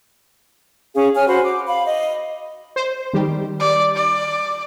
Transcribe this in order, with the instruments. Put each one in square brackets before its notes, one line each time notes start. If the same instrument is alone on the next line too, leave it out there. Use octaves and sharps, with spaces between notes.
[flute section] C#4 G#4 F5
C#5 G#5 F6
F#4 C5 B5
D6
F5 B5
D#5
[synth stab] C5
D#3 G3 G4
[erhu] D5
D5